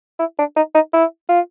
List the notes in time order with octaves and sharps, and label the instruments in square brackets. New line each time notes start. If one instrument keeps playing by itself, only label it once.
[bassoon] E4
D4
D#4
D#4
E4
F4